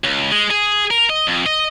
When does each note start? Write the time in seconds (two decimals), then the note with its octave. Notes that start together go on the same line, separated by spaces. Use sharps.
0.04 C#2
0.32 G#3
0.50 G#4
0.91 A#4
1.10 D#5
1.27 F2
1.46 D#5